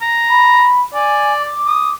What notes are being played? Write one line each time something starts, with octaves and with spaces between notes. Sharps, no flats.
A#5
B5
D5 G#5
D6
D#6